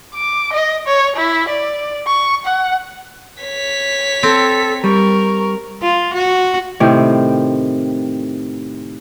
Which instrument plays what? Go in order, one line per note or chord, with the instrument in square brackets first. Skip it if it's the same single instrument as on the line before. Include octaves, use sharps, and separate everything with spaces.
[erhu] D6
D#5
C#5
E4
D5
C#6
F#5
[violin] C#5 B6
[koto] C4 [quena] A4
[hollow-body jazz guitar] G3 [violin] A#4 [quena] C#6
[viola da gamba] F4
F#4
[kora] A2 C3 D#3 C4